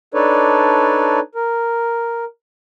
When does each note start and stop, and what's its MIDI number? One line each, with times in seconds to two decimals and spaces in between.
0.14 1.20 62
0.14 1.20 63
0.14 1.20 69
0.14 1.20 71
0.14 1.20 73
0.14 1.20 74
1.35 2.25 70